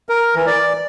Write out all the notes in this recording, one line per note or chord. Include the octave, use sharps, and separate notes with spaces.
A#4
E3
D5